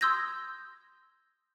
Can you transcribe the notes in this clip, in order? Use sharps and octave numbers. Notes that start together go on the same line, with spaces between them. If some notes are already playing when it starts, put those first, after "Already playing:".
C6 D#6 E6 G6 G#6 A#6